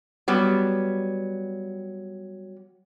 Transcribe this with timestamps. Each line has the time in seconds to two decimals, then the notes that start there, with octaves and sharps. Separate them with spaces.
0.28 F#3 G3 B3